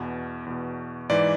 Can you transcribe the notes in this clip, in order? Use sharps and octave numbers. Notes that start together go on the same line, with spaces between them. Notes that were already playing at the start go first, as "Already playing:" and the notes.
Already playing: E2 B2
E2 B2
G#2 E3 D5